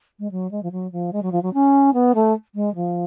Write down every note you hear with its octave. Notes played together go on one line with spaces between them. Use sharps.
G#3
F#3
G#3
F3
F#3
F3
G#3
F#3
F3
F#3
C#4
B3
A3
G#3
F3